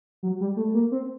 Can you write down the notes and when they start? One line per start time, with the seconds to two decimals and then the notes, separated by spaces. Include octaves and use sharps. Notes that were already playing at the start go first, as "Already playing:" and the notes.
0.23 F#3
0.41 G3
0.57 A3
0.74 A#3
0.92 C4